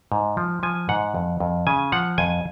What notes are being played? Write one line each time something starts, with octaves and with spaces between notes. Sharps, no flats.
G#2
F3
F3 G#5
G#2 F#5
F2
F2
C#3 G#5
F3 F#5
F2 G#5